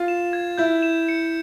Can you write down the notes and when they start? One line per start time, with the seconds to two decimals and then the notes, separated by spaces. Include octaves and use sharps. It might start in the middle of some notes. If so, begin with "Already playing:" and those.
Already playing: F4
0.08 E7
0.33 G#6
0.58 E4 G6
0.82 E7
1.08 C#7